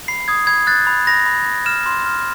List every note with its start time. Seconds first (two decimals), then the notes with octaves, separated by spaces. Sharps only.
0.08 B5 C7
0.28 D#6 G#6
0.47 B5 G#6
0.67 F#6 A6
0.87 B5
1.07 B5 A#6
1.26 B5
1.46 B5
1.66 F6 E7
1.86 C6
2.06 F6